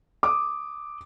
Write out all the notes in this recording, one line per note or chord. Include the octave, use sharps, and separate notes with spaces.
D6 D#6